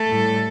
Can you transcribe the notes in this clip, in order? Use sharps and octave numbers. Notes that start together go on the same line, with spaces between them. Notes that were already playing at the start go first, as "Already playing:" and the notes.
Already playing: A3 A4
A2 G3